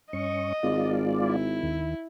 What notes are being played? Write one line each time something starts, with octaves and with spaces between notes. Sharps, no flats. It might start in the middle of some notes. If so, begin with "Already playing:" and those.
G2 C#4 D#5 C#6
G#1 G#3 F4 D5
E4
D#2 D#3